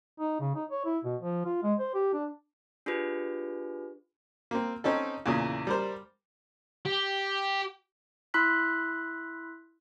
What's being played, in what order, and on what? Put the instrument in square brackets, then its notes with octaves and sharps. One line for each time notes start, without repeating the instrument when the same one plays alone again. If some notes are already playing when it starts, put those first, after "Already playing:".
[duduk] D#4
C#3
D#4
C#5
E4
B2
F3
F4
G#3
C5
G4
D4
[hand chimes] D4 F4 G4 G#4 B4
[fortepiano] A#3 C4
C4 C#4 D#4 A4
E2 A#2 C#3 D#6
G3 A#4 C5
[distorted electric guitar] G4
[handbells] E4 B5 C6 E6 F#6 B6